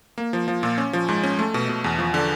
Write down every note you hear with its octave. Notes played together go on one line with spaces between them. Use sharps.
A#3
F3
F3
A#2
C#4
F3
G#2
C#4
A3
B2
B2
E2
F3
D3